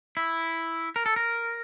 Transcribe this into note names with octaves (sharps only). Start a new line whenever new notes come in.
E4
A#4
A4
A#4